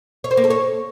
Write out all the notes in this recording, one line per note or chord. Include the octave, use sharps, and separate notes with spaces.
C#5
C5
A#3
A4
C#5